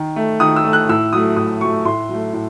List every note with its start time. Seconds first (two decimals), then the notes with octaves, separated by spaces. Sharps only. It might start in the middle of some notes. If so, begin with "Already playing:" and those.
Already playing: D#3
0.16 A3
0.40 D#3 D#6
0.56 E6
0.64 A3
0.73 F#6
0.89 A2 E6
1.13 F#3 A3 D#6
1.36 A2 D#6
1.61 F#3 A3 C#6
1.85 A2 C6
2.09 F#3 A3
2.33 A2